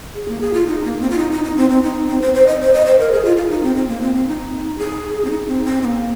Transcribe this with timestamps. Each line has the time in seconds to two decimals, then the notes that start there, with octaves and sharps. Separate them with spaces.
0.15 G#4
0.28 A#3
0.41 G#4
0.54 F4
0.67 D#4
0.84 A#3
1.01 C4
1.10 F4
1.18 D#4
1.32 D#4
1.44 D#4
1.57 C4
1.70 C4
1.83 D#4
2.08 C4
2.22 C5
2.34 C5
2.47 D#5
2.61 C5
2.73 D#5
2.86 C5
2.99 A#4
3.12 G#4
3.25 F4
3.37 F4
3.50 D#4
3.63 C4
3.76 C4
3.88 A#3
4.02 C4
4.15 C4
4.28 D#4
4.79 G#4
5.25 C4
5.30 D#4
5.48 C4
5.65 C4
5.82 C4
5.85 A#3